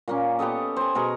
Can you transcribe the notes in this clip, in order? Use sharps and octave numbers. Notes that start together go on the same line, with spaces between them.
A#2 A#3 C#4
B3 G4 A4 D#5
C5 G#5
B2 G#4 A#4 C#6